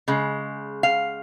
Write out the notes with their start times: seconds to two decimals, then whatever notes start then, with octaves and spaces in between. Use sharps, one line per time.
0.08 C#3 G#3
0.83 F5